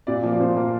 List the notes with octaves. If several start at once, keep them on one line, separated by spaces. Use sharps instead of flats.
A#2 D5
F3 A#3
D5
A#2 C5
F3 A#3 A#4